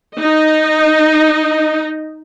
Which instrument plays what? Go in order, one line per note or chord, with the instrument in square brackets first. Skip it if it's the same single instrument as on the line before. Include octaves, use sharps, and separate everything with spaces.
[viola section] D#4 D#5